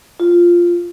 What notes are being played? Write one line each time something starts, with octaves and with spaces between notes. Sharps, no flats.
F4